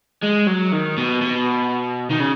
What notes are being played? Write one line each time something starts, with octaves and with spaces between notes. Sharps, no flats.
G#3
F#3
D#3
B2
B2
D#3
C#3